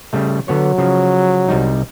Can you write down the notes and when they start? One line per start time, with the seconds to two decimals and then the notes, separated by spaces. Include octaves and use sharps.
0.13 C#3 G3 A3
0.48 D3 F#3 B3 C#5
0.78 C#3 F3
1.48 C2 G3 D#4